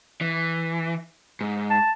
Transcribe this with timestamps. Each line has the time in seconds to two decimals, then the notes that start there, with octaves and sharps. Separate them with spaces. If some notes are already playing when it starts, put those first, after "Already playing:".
0.21 E3
1.41 G#2
1.71 A5